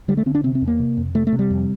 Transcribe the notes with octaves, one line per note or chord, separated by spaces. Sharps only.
D3 G3
A3
D3 C4
D4
C3 C4
C4
E2
A#3
C3
F2
C3 A3
A3
C3
G3
F2